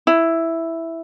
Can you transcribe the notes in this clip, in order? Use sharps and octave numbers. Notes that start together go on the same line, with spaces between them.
E4